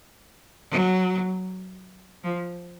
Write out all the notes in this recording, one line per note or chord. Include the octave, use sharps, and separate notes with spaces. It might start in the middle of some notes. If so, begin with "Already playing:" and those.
F#3
F3